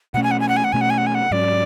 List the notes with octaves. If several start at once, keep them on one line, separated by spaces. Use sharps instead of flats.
B2 A3 C#4 F#5
G#5
F#5
G#5
F#5
G#5
F#5
B2 A3 C#4 G#5
F#5
G#5
F#5
G#5
F#5
G#2 F#3 C#4 D5